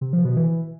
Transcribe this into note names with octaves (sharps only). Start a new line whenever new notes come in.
C3
F3
B2
E3